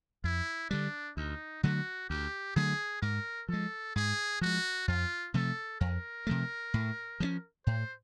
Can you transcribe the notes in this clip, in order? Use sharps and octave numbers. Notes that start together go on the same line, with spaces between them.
F2 E4
D3 G3 D4
D2 D#4
D3 F#3 A3 F#4
D2 G4
D3 F#3 A3 G#4
G#2 A#4
F3 G#3 A4
G#2 G#4
F3 G#3 F#4
F2 F4
C3 F3 A3 A4
F2 A#4
C3 F3 A3
A2
F3 G#3 C#4
A2 C5